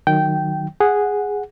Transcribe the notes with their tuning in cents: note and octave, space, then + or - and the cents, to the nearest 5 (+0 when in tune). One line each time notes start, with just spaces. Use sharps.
D#3 -20 F#3 +0 G5 -15
G#4 -5 F#5 -5